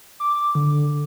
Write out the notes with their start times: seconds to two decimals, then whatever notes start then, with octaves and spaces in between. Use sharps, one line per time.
0.20 D6
0.55 D3